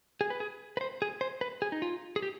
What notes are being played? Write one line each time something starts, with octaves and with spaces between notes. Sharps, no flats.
G#4
B4
G#4
B4
C5
G#4
C5
B4
G#4
D#4
F4
G#4
G4